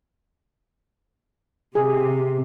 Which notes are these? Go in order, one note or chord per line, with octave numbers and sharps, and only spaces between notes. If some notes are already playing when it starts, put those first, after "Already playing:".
C3 G#4